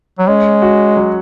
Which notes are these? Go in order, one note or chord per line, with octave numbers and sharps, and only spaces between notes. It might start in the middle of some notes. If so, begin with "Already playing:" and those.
F#3
G#3 C#4
F#4
F#3